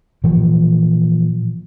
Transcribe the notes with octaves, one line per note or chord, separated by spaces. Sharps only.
A#2 E3 F3